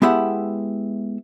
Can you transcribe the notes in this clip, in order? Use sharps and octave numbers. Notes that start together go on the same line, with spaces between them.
G#3 B3 E4 G4 E5 F#5